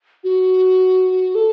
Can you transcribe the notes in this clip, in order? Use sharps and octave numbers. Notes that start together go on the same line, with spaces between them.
F#4
A4